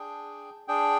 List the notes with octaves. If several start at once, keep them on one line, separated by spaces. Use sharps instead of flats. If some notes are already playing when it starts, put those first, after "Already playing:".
Already playing: D4 G#4 G5
D4 G#4 G5